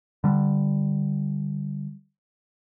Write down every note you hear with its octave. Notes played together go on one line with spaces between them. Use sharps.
D3 G3